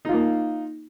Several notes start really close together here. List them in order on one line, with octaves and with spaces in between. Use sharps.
D#4 F4 A#3